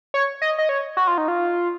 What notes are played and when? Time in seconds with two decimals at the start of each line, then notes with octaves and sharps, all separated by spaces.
0.14 C#5
0.42 D#5
0.59 D#5
0.69 C#5
0.97 F#4
1.08 F4
1.18 D#4
1.28 F4